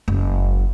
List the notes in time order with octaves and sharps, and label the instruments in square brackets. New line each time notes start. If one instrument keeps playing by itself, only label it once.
[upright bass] F#1